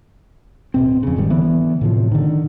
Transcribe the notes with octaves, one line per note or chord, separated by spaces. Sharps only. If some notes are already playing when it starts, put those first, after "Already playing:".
D1 B2 C4
F2 C#3
F1 G#2 D#3 G3
D3 E3 B3
A2 C3 F3
D3 D#3